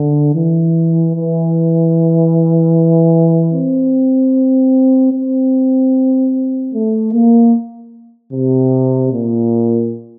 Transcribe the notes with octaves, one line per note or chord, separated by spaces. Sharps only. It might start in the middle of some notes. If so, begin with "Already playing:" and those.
Already playing: D3
E3
E3
C4
C4
A3
A#3
C3
A#2